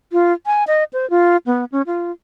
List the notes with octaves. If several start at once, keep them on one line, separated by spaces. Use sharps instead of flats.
F4
G#5
D#5
C5
F4
B3
C#4
F4